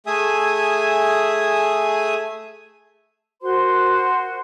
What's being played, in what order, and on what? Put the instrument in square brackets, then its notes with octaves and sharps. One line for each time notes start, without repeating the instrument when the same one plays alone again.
[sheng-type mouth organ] A3 G#4 E5 G#5 D#6
[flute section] F#4 A#4 C5 C6